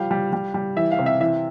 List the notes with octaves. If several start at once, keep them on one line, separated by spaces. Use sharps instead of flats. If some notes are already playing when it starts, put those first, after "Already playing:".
Already playing: F3 G3 F5
G3
G3
G3
E3 E5
F5
C3
E5
E3 E5